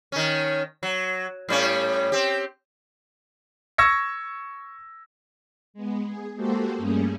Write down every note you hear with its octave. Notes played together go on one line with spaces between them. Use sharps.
D#3 C#4
F#3
A2 G3 C#4
C4 G4
C#6 E6 G#6 A#6 C#7
G#3 B3
G#4
G#3 A#3 F#4 G4 A4 C5
G2 G3 A3 A#3 C#4 G#4